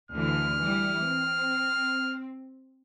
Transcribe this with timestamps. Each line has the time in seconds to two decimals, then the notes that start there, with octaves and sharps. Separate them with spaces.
0.11 D2 D3 E3 F6
0.59 E3 G3
1.04 C4